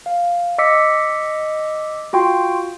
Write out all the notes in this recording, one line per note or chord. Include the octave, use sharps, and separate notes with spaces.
F5
D#5 D6 E6 B6 C#7
F4 F#4 G5 C6